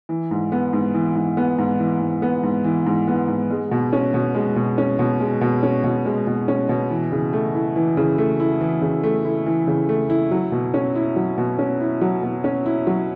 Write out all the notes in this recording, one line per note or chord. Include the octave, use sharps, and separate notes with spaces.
E3
G#2
B3
G#2
E3
G#2
B3
G#2
E3
G#2
B3
G#2
E3
G#2
B3
G#2
G#3
B2
C#4
B2
G#3
B2
C#4
B2
G#3
B2
C#4
B2
G#3
B2
C#4
B2
E3
C#3
A3
E4
E3
C#3
A3
E4
E3
C#3
A3
E4
E3
C#3
A3
E4
F#3
B2
C#4
E4
F#3
B2
C#4
E4
F#3
B2
C#4
E4
F#3